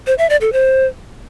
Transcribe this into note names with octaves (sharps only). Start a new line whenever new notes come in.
C5
E5
D5
A4
C5